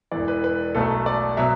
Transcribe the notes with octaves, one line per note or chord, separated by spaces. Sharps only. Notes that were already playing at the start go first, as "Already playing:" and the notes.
E1 E2 E3 D5
B4
B4
B1 B2 F#3 A3 A4
D5
B2 F#3 E5